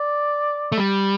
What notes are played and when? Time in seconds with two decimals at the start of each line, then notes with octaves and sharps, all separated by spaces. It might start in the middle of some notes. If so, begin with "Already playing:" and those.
Already playing: D5
0.72 A3
0.78 G3